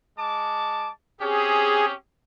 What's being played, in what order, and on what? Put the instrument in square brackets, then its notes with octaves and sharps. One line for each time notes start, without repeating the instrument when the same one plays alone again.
[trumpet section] G#3 A5 D6
[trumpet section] C4 C#4 G4 [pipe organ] G#4